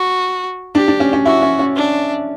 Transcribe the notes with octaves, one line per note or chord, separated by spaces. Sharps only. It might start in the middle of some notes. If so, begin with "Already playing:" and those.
Already playing: F#4
D4 G4
D4
C#4
C#4
E4 F#4
C#4
C#4
D4